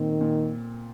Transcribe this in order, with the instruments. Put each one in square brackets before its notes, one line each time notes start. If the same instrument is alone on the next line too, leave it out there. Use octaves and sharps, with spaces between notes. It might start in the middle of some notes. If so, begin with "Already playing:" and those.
Already playing: [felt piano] A#2 C4 [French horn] D#3
[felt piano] A#2